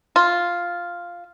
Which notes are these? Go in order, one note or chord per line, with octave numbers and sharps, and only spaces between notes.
F4